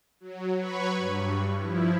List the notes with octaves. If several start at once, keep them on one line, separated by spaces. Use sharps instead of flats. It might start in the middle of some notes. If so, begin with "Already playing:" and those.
F#3
F#3 B4 C#5 B5 C#6
G2
F3 E4